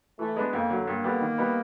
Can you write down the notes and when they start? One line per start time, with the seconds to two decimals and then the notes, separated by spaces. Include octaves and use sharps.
0.19 E3 A3
0.36 G#3 B3 D4
0.53 F2 A#3
0.70 D3 F#3
0.87 G2 A#3
1.04 D3 G3 B3
1.21 D#3
1.38 G3 B3 D#4